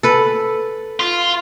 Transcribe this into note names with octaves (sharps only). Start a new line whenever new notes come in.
A4 B4
F4